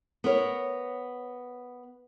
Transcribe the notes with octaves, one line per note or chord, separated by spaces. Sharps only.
B3 A#4 C#5